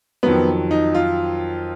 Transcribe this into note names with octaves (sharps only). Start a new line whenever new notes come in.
F2 D#3 F#3 B3
D#4
F4